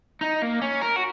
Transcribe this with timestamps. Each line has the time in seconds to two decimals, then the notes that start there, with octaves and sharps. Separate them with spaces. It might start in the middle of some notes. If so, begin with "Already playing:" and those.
0.21 D#4
0.42 A#3
0.62 C#4
0.81 A#4
0.96 F#4